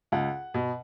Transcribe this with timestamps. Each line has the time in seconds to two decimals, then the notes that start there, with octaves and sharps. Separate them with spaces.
0.12 C#2 F#5
0.54 B2